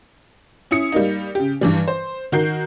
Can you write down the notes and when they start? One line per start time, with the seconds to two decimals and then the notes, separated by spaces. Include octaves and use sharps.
0.71 C#4 E4 D#6 C#7
0.92 G3 A#3 D#4
1.35 C#3 G4
1.61 G2 E3 G3
1.88 C5
2.32 D#3 F#4 A#4 G6 C7